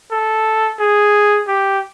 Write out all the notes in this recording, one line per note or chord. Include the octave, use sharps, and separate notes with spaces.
A4
G#4
G4